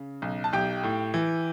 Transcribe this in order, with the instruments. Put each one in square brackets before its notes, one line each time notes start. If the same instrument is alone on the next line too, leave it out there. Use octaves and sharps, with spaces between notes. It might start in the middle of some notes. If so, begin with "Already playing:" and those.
Already playing: [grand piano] C#3
B1
A5
B1 G4 G5
A2
E3